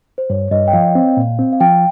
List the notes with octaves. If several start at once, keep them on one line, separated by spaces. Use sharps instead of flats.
C5
G2 C#5
G2 D#5
G5
F3 F5
C4
A#2
C4
F5
F3 G5